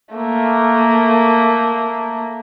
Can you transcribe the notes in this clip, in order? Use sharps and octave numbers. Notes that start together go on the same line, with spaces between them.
A3 A#3